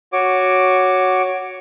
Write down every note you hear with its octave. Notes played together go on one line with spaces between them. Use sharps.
F#4 C#5 D6